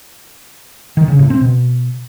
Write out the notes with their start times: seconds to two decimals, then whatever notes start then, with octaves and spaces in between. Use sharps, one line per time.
0.97 D#3
1.08 C#3
1.19 A2
1.30 C4
1.41 B2